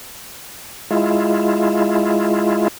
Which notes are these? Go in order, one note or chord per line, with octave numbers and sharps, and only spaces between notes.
G#3 E4 F4